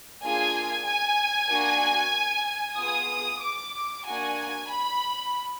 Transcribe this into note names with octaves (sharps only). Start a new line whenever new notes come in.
A#3 D4 F4 G#4 G#5
G#5
A#3 D4 F#4
B3 F4 G#4 D#6
D6
A#3 D4 F#4 G#5
B5